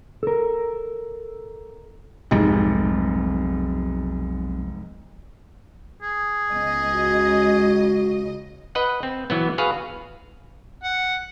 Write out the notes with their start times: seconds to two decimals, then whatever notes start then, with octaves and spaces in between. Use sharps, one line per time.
0.23 A4 A#4
2.31 F1 B1 G#2 C3 G3
6.02 G#4
6.54 C#2 B3 D#5
6.91 F#4
8.75 B4 D#5 F#5
9.03 C4
9.30 E3 F#3 B3
9.58 F#4 G#4 B4 F5
10.83 F#5